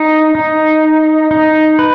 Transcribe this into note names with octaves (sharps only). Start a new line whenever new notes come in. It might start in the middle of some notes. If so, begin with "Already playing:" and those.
Already playing: D#4
D#4
D#4
B4